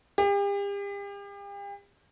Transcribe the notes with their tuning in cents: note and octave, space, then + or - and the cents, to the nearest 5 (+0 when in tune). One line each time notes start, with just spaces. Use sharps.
G4 +40